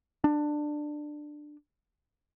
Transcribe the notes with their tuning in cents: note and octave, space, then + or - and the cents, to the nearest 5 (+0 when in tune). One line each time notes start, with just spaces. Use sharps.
D4 +15